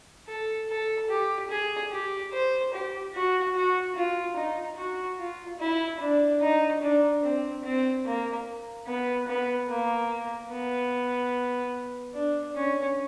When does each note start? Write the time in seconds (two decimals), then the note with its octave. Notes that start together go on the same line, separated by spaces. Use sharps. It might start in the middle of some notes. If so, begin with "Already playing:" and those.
0.28 A4
0.69 A4
1.10 G4
1.50 G#4
1.91 G4
2.33 C5
2.74 G4
3.13 F#4
3.55 F#4
3.96 F4
4.36 D#4
4.77 F#4
5.19 F4
5.59 E4
6.00 D4
6.41 D#4
6.82 D4
7.23 C4
7.64 C4
8.05 A#3
8.87 B3
9.27 B3
9.69 A#3
10.50 B3
12.14 D4
12.55 C#4